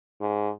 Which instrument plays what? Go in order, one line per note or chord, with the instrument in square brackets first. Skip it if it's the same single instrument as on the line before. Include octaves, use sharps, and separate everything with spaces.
[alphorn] G#2